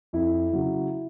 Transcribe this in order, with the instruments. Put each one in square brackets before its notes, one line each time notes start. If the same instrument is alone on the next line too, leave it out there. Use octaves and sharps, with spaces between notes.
[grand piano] F2 E4
C#3 F#3